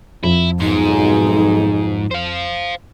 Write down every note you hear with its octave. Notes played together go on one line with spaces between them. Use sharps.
F2 E4
B1 G#2 G#3 D#4
C5 F5